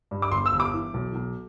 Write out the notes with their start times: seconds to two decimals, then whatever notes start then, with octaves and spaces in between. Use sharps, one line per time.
0.11 G2
0.22 D6
0.31 G1 C6
0.46 E6
0.52 G1
0.60 D6
0.74 E3
0.94 B1
1.15 B1